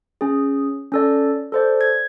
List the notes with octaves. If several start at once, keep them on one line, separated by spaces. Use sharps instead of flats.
C#4 G#4
C#4 A4 D5
A4 C5 D5
G#6